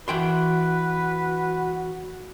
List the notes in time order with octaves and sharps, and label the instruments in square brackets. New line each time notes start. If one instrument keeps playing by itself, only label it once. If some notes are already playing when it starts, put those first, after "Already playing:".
[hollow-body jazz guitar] E3 G5 C6 [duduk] F#4 [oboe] B4